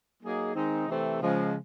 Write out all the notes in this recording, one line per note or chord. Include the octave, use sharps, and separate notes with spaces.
F#3 A#3 D#4 G#4
D#3 G#3 C4 D#4
C3 E3 A3 C4
C#3 F3 G#3